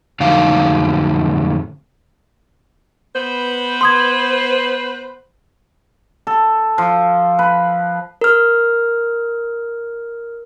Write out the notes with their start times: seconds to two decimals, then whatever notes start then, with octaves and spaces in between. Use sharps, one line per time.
0.20 F2 A2 D3 F#3 D#4 F5
3.15 B3 B4 C5
3.81 C6 D#6 G#6
6.27 A4
6.78 F3
7.39 B4
8.21 A#4 F6